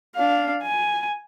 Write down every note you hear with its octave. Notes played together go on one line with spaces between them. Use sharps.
D4 F5
G#5